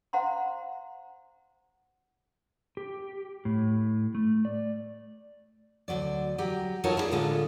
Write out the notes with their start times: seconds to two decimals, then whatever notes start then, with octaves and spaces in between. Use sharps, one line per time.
0.13 C5 F5 F#5 A#5 C6
2.77 G4
3.45 A2
4.15 A3
4.45 D5
5.88 D2 A2 F#3 D5
6.38 F#3 G4
6.84 F#3 D#4 F4 A4 A#4 C#5
6.97 E4 G#4 D5
7.11 A2 D3 G#3 F4 A4